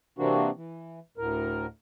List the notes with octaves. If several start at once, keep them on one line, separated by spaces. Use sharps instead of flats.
C3 E3 A#3 C4 D4 F#4
E3
D2 A2 A#4